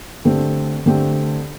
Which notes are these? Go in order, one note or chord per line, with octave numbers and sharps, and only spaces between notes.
D3 A3 C4 G4
D3 A3 C4 G4